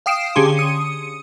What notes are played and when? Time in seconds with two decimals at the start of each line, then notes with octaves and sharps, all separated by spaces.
0.06 F5 G5 D#6 C7 D7 E7
0.36 D3 C#4 G4 G#4 C6
0.57 D#6 C#7 D#7